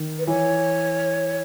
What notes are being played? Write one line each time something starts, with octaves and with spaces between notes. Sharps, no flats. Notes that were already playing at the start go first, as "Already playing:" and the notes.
Already playing: D#3
B4
E3 C#5